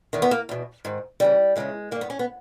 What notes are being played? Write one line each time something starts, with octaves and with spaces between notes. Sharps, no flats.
E2 D#3
B3
A#3
E2 B2
G#2 D#3
D#2 C#3 E3 G3
E2 C#3 E3 G#3
G2 D#3 A#3
B3
C#4
B3